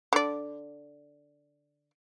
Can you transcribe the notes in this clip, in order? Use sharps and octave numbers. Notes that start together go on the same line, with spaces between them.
D3 D5